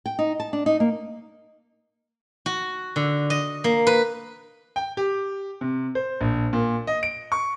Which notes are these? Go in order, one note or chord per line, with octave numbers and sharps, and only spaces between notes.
G5
D#4
A5
D4
D#4
A#3
F#4
D3
D#5
A#3
B4
G5
G4
C3
C5
A#1
A#2
D#5
D7
C#6